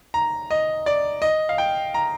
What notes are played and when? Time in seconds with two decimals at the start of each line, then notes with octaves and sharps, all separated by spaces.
0.14 A#5
0.51 D#5
0.86 D5
1.22 D#5
1.49 F5
1.58 G5
1.94 A#5